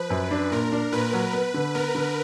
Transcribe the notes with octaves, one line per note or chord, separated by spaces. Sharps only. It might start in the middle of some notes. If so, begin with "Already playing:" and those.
Already playing: F3 B4
F#2
D4
A#2 A#4
D4
A#2 B4
F#3
B3
D3
B3 A#4
D3